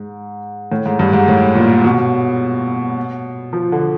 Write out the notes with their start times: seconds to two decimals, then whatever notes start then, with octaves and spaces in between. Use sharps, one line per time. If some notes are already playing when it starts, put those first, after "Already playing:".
Already playing: G#2
0.72 A2
0.86 G#2
0.99 G2
1.13 G#2
1.28 A2
1.55 A#2
1.84 B2
3.53 F3
3.72 D3